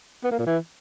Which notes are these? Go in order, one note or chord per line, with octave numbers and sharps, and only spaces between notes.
B3
A#3
A#2
E3